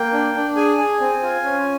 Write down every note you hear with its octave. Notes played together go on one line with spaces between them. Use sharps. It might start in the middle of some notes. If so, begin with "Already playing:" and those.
Already playing: A#3 G5
D4
D4
G#4 G#5
G#4
C4
F4
C#4